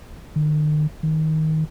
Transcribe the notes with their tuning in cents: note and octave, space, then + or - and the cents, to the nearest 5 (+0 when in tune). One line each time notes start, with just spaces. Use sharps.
D#3 -45
D#3 +15